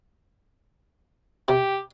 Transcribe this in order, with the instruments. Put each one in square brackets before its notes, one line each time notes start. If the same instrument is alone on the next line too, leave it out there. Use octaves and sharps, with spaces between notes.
[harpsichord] C3 [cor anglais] G4